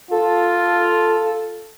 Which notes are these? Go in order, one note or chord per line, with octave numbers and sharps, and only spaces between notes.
F4 A4